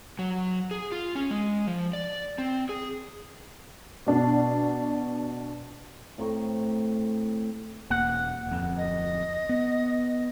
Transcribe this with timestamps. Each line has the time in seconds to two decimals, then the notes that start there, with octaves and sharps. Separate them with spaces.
0.19 F#3
0.71 G#4
0.92 F4
1.15 C#4
1.31 G#3
1.67 F3
1.93 D5
2.38 C4
2.69 G#4
4.06 B2 D4
6.18 A2 C4 A#5 C#6
7.90 E1 A#3 F#5
8.47 D1 F2
8.77 D#5
9.49 B3